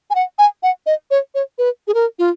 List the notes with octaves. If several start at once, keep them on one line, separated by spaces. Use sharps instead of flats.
G#5
F#5
G#5
F#5
D#5
C#5
C#5
B4
G#4
A#4
F4